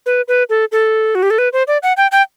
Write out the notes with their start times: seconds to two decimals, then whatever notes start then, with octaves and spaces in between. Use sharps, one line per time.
0.06 B4
0.28 B4
0.49 A4
0.72 A4
1.15 F#4
1.23 G4
1.30 A4
1.38 B4
1.53 C5
1.68 D5
1.83 F#5
1.97 G5
2.12 G5